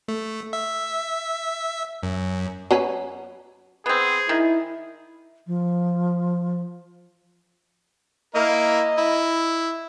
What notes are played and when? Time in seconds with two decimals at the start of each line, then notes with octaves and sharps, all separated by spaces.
0.08 A3
0.53 E5
2.03 F#2
2.71 F#3 C#4 B4
3.86 B3 C4 G#4
4.29 D#3 E4
5.47 F3
8.35 A#3 E4 A#4 D#5
8.97 E4